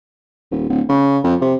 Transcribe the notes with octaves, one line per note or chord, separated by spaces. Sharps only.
D#1
D1
C#3
F2
C3